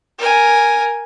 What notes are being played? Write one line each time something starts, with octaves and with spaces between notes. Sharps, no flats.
A#4 G#5